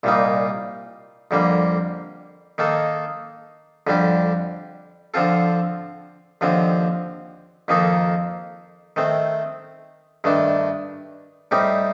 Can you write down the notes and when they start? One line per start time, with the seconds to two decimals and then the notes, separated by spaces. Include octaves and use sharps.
0.03 C2 A#2 G3 A#3 D#4
1.31 F2 D3 G3 A#3
2.58 D#3 A#3 D#4 A4
3.87 F2 D3 G3 D4 G4
5.14 D3 F3 C4 F4 A4
6.41 D#2 D3 F3 C4
7.68 F2 D#3 A#3 D#4 A4
8.96 D#3 A3 C4
10.24 G2 D#3 A3 D4
11.51 A2 G3 C4 D#4 G4